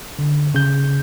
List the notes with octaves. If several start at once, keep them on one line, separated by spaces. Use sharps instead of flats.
D3
C#3 G6